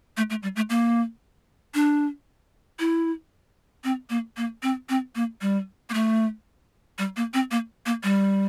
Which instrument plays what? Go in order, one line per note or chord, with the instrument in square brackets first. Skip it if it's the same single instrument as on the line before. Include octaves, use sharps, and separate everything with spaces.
[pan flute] A3
A3
G3
A3
A#3
D4
E4
C4
A#3
A#3
C4
C4
A#3
G3
A#3
A3
G3
A#3
C4
A#3
A#3
G3